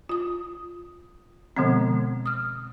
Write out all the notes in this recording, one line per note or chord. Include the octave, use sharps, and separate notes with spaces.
F4 D#6
B2 D3 F3 G#3 B3 C4
D#6 F6